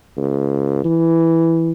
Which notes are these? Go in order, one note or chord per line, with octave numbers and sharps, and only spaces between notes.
C#2
E3